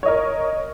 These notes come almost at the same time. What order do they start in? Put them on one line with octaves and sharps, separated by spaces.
C#5 D#5 A#4